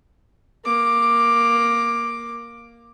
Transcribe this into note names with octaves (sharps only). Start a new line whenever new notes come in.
A#3 D6